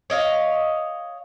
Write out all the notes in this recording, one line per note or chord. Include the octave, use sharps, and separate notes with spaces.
C#5 D#5 F5